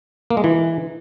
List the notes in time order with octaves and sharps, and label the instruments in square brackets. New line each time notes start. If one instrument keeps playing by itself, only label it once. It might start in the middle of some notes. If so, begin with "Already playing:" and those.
[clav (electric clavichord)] A#3
G#3
E3